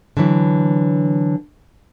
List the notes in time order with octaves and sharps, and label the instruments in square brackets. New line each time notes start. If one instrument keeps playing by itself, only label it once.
[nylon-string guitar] D3 E3 F#3 E4